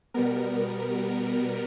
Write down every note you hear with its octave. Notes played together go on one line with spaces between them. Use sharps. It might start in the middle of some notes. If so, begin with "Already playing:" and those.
B2 G3 B3 A#4